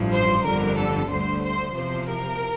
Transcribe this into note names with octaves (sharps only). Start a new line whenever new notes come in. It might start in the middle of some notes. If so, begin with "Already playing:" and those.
Already playing: A1 G2 F3
C5
G1 F2 D3 G3 A#4
A4
D2 D3 G3 C5
C5
E2 C3 F3 C5
A#4